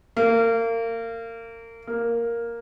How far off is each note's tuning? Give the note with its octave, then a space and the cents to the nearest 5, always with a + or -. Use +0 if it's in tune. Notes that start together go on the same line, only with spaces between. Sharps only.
A#3 -30
A#3 +0